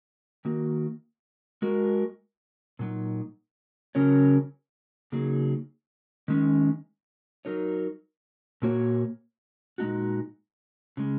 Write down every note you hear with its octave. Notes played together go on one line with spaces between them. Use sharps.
D#3 A#3 F#4
G#3 F#4 A#4
A#2 F#3 D#4
C#3 F#3 C#4 A#4 C#5
C#3 F#3 A#3 D#4 G#4
D#3 G#3 C#4
F#3 D#4 A#4 C#5
A#2 A#3 F#4 C#5
A#2 G#3 D#4 F#4
C#3 G#3